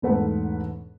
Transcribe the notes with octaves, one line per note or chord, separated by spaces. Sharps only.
E1 G#2 A3 B4 F#5